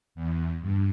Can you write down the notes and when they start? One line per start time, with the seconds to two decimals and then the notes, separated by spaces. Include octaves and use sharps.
0.15 E2
0.61 G2